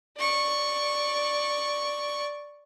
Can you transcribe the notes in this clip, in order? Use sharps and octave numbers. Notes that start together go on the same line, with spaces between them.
D5 C#6